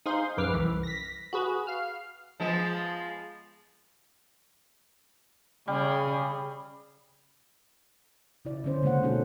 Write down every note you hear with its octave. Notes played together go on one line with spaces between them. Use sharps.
D#4 G#4 C5 F5 C6
A#1 F#2 B4 D6 F6
C2 E3
A#6 B6
F#4 G#4 B4
F5 F6
F3 G#3 B3
C#3 G3 G#4
C#3 E4 D5
D3 B3 C#4 C5
C#3 G#3 A#3 C5 F#5
B2 B3 C#4 D#4 F#4 A4